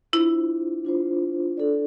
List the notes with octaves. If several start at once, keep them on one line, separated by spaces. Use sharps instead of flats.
D4 E4 F4 C5
D4 F4 C5
D4 A4 D5